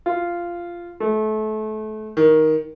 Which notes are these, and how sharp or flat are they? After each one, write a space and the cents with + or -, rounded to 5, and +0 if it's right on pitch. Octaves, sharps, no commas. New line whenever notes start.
F4 -10
A3 -30
D#3 +10